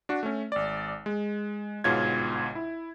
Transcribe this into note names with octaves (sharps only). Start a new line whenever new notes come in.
D4 F#4
A3 C#4
G#1 D5
G#3
G1 G#2 B2 F4 C#5 G#6
E4